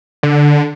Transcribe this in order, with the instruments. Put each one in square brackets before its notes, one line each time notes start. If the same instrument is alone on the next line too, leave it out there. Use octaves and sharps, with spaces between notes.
[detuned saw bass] D3